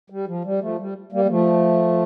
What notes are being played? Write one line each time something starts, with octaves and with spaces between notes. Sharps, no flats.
G3
F3
G3
F3 A3
G3
G3 A#3
A#3
F3 A3